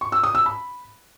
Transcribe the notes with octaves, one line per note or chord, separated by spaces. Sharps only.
C#6
E6
D#6
E6
B5